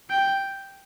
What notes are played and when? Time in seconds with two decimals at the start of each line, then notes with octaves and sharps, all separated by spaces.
0.10 G5